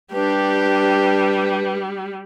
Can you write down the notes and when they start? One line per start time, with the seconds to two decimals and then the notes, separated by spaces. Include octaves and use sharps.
0.13 G3 D4 G4 B4